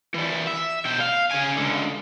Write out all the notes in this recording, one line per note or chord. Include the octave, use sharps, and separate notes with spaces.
E3 G3
E5
B2 G5
F5
C#3 G#5
C#2 D3